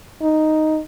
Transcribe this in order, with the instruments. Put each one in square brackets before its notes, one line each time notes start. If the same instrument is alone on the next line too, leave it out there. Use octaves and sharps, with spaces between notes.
[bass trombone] D#4